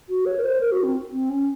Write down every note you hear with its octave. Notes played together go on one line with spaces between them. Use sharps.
F#4
C#5
A#4
C5
A#4
F#4
C4
C4
C#4